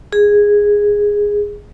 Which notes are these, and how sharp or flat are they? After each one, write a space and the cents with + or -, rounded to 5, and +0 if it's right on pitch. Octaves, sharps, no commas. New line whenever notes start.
G#4 -10